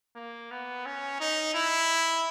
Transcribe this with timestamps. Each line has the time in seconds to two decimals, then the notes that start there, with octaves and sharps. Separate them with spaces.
0.16 A#3
0.51 B3
0.86 C#4
1.21 D#4
1.54 E4